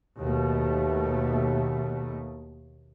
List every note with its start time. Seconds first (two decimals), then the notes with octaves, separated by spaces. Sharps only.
0.17 D#2 B2 A3